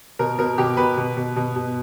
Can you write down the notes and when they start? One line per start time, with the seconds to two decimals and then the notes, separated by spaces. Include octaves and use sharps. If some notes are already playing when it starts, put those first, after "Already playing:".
0.19 B2 A#4
0.39 B2 A#4
0.58 B2 G4
0.77 B2 B4
0.97 B2
1.17 B2
1.36 B2
1.56 B2